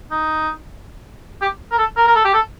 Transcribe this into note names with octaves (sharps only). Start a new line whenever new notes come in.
D#4
G4
A#4
A4
A#4
A#4
A4
G4
A4